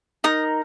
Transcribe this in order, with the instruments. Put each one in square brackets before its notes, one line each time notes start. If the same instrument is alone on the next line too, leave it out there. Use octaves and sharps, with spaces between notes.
[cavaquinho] D#4 A#4 D#6